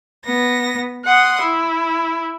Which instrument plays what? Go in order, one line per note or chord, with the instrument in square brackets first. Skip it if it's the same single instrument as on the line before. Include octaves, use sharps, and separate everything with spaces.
[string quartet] B3 A#6
F#5 C6 D#6
E4